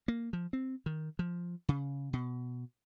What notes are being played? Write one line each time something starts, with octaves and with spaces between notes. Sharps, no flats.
A#3
F3
C4
D#3
F3
C#3
B2